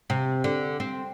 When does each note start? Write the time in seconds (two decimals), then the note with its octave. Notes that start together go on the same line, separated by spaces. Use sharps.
0.10 C3
0.44 D3
0.80 C4